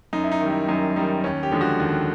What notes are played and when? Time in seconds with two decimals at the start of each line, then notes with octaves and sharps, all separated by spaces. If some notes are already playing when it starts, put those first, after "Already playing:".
0.13 F#2 D#4
0.24 E4
0.32 D#4
0.41 D#3 G3
0.50 E4
0.68 F#2 D#4
0.96 D#3 G3 D#4
1.24 D#2 C#4
1.43 G4
1.52 D3 F3 G#3
1.61 F#4
1.80 D#2